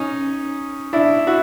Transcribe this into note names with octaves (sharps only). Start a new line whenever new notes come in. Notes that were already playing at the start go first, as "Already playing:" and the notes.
Already playing: C#4 D#4
D4 E4
E4 F#4